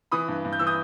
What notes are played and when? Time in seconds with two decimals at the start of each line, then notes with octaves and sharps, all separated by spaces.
0.12 E3 B5 D#6
0.28 G2
0.45 G2
0.53 G6
0.59 E3 E6
0.67 D#6 G6